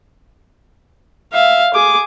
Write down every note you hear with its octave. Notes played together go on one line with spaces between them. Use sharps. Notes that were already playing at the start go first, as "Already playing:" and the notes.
E5 F5
G#4 D6